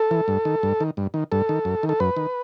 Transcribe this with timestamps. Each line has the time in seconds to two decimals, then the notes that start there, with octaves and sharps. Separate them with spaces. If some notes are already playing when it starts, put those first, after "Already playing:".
Already playing: A4
0.11 E3
0.28 G2
0.45 D#3
0.63 G2
0.80 D#3
0.97 G2
1.14 D#3
1.32 G2 A4
1.49 D#3
1.65 F#2
1.83 D#3
1.89 A4
2.00 F#2 B4
2.17 D#3